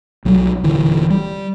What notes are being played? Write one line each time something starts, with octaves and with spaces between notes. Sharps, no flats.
B1 F#3 G3
D#1 D3 E3
G3